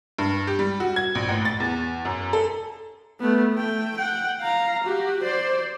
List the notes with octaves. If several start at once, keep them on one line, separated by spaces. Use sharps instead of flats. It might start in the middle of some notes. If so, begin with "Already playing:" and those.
G2
G4
G3
F#4
G#6
A#1
A1
A6
E2
F#2
A4
A3 B3
A3 G5
F#5 G5
F5 A#5
F#4 G4
C5 D5